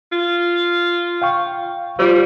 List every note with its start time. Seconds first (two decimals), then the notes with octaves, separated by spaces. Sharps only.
0.12 F4
1.22 F5 G5 C#6
1.99 G3 F4 C5